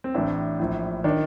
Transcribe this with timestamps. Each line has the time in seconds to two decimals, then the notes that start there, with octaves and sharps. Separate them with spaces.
0.04 C4
0.15 A1 A2 D4
0.59 A#1 A2
1.04 D#3 D4